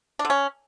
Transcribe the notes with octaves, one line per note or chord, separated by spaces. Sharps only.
D4
D3
C#4